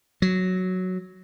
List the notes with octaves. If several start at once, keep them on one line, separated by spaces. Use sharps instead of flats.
F#3